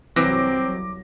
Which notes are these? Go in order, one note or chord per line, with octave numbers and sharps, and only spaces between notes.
C2 E3 F#3 C4 D6 A#6